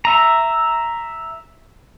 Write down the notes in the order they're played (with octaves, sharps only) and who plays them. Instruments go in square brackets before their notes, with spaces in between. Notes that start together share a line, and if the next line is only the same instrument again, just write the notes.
[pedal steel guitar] E5 A#5